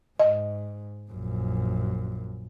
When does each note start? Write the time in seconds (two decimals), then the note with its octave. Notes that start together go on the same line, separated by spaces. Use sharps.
0.20 G#2 D#5
1.11 A#1 F#2